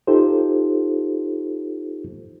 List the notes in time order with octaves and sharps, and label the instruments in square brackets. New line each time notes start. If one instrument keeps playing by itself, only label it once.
[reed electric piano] D#4 F4 G4 A4 C5